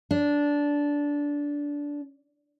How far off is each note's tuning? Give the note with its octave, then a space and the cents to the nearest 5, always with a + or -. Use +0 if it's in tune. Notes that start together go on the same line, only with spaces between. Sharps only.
D4 -15